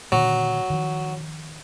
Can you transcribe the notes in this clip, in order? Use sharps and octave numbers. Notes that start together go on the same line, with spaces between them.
A#2 D3 D#3 F#3
D#3 F3